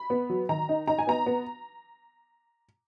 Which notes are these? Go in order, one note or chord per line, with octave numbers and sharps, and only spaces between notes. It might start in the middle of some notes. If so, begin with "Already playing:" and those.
Already playing: B5
B3
F#3
D#3 A#5
D#4
D#4 A#5
G#5
B3 A#5
B3